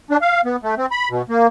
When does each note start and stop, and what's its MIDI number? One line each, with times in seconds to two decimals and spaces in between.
0.10 0.17 62
0.21 0.41 77
0.45 0.56 59
0.63 0.75 57
0.78 0.86 60
0.91 1.09 83
1.10 1.22 47
1.29 1.47 58